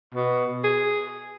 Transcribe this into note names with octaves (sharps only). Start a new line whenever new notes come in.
B2
G#4